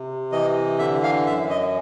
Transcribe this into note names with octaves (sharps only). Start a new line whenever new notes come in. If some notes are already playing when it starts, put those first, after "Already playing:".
Already playing: C3
E3 D#5
D3 E5
F5
F#2 E5
D#5